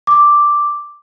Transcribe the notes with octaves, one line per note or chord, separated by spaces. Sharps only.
D6